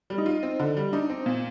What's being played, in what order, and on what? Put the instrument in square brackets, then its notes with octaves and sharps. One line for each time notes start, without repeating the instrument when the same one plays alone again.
[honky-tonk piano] G3
[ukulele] D#4
[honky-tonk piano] F4
C4
D3
G3
[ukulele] D4 [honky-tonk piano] D#4
[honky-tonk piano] C4
A#2